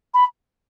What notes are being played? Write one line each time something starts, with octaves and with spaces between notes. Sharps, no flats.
B5